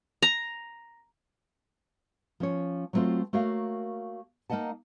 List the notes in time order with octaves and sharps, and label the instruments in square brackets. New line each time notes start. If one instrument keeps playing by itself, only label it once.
[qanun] A#5
[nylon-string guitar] F3 C#4 C#5
F#3 G3 A3 C4 F4 F#4
A3 A#3 F#4 A#4 C#5 F5
A#3 D#4 D#5 F#5 A5